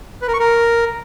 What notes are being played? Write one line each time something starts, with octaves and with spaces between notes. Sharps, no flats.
B4
A#4
C#6
A#4